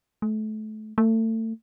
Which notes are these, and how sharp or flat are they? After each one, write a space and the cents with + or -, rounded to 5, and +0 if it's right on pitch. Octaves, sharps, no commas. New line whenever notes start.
A3 -30
A3 +30